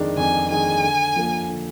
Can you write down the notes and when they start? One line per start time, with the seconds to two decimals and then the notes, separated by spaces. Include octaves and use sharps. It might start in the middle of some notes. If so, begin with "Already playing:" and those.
Already playing: F2 D#3 G#3 D4 G#4
0.17 F2 G#5
0.51 D#3 G#3 D4 G#4 G#5
0.83 D3
1.16 F3 A#3
1.48 D3